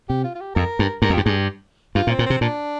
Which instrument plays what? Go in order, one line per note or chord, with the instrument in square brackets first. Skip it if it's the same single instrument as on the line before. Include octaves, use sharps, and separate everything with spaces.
[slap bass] C3 [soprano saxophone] G4
[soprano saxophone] F4
F4
G4
[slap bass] F2 [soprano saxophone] A#4
[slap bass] G2
[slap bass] G2 [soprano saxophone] A#4
[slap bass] F2
[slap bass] G2 [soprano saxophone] G4
[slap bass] G2 [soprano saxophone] G#4
[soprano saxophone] G4
[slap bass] G2 [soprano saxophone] F4
[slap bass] A#2
[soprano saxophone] C4
[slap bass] A#2
[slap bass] C3 [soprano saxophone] C4
[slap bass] A#2 [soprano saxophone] D4